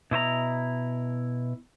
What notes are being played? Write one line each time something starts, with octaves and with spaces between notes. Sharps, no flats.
B2 E4 C5 A#5